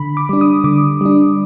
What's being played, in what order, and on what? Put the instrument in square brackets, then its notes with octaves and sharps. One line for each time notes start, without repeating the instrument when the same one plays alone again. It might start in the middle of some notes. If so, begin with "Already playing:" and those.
Already playing: [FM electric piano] D3 B5
D6
G3 D4
D#6
D3 D6
G3 D4